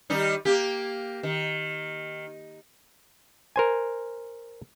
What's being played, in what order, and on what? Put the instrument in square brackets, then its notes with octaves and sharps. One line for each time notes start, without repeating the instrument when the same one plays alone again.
[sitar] D#3 G3 D#4
A#3 G4
D#3
[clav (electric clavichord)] A#4 C5 G#5